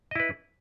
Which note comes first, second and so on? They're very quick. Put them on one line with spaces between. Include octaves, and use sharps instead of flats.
D#5 E4 B4